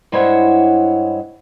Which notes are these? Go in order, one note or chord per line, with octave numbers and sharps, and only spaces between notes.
G2 G#3 E4 C5 C#5 F#5